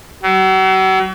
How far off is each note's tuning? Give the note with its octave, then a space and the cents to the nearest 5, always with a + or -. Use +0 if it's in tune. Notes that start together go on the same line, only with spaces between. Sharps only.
F#3 +40